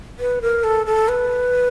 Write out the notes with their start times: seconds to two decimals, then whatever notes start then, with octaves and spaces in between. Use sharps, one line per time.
0.19 B4
0.42 A#4
0.64 A4
0.86 A4
1.08 B4